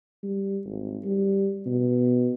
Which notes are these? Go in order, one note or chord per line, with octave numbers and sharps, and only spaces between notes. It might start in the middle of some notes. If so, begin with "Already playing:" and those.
G3
G#1
G3
B2